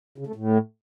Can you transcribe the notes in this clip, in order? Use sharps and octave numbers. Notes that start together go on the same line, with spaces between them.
C#3
A3
A2